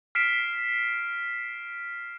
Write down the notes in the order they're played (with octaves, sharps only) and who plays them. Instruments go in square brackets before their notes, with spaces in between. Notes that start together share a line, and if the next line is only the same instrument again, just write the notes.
[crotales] F6 B6 C7 D7 E7